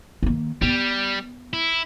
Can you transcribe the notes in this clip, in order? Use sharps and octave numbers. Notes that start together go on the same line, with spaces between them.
D#3 A#3
G3 B3
E4